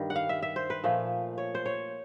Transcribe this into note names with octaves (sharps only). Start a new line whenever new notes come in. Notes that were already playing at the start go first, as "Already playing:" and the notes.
Already playing: G2 D#3 G3
F#5
F5
E5
E5
C5
B4
A#2 F3 A3
C#5
C5
C#5